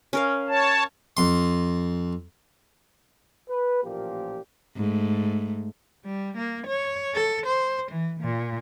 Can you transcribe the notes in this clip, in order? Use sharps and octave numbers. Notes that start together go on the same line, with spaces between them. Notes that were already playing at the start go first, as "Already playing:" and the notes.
C#4 A#4 F5
C#5 A5
F2 C6
B4
A1 A#2 F3 A#3 G4
G#2 A3
G3
A#3
C#5
A4
C5
E3
A#2